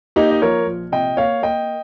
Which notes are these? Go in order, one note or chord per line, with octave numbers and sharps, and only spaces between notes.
A#3 D#4 G4
D#5
F3 A#4 C#5
A#1
C3 D#5 G5
A#3 C#5 F5
A#3 D#5 G5